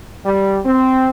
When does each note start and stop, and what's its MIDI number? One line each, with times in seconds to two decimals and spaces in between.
0.24 0.59 55
0.64 1.10 60